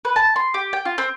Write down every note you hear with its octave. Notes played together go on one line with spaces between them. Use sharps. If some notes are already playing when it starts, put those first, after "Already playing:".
B4
A5
C6
G4
G5
F4
C4